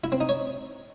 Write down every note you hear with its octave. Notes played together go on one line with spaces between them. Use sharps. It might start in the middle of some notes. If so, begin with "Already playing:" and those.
E4
C4
D#4
C#5